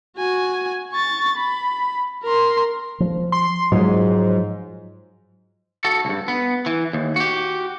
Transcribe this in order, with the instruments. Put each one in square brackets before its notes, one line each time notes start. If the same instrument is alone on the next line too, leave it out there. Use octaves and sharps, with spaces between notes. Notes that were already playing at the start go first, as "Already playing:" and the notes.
[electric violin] F#4 G#5
C#6 A6
B5
A#4 C6
[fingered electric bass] F3
[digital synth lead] C6
[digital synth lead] G#2 [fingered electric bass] F3 F#3
[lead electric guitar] F#4 A4
C#2 G2
B3
E3
D#2
F#4 G4